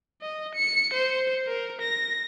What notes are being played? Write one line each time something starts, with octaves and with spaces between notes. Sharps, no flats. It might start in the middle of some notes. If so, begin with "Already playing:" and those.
D#5
C#7
C5
A#4
A#6